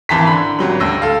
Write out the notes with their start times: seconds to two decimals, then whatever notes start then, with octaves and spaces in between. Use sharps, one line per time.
0.09 G#1 E3 A5 A#5 B6
0.27 D3 B5
0.59 G#1 F#3 G3
0.80 D2 E6 A#6
1.02 A4 F5